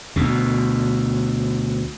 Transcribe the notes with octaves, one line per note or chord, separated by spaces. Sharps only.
D2 B2